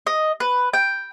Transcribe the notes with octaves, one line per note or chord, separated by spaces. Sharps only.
D#5
B4
G5